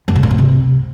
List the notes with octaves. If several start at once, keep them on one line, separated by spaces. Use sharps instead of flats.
F#2
C3
A#2
A2
C3